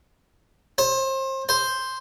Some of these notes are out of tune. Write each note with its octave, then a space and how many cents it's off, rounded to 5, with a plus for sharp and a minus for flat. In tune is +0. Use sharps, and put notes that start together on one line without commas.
C5 +30
C5 +0